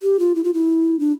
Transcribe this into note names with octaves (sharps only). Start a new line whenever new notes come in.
G4
F4
E4
F4
E4
D4